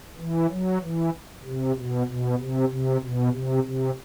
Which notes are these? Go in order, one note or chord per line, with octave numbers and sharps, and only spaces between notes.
E3
F#3
E3
C3
B2
B2
C3
C3
B2
C3
C3